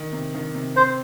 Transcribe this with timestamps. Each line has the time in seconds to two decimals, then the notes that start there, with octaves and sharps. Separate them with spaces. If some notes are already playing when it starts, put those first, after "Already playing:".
Already playing: D#3
0.12 C3
0.35 D#3
0.55 C3
0.76 C4 C5